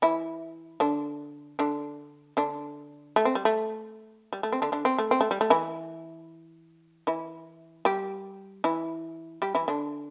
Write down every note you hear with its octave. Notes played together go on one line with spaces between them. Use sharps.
E3 E4
D3 D4
D3 D4
D3 D4
A3
C4
G3
A3
G3
A3
C4
D3 D4
D3 D4
C4
A3
C4
A3
G3
A3
E3 E4
E3 E4
G3 G4
E3 E4
G3 G4
E3 E4
D3 D4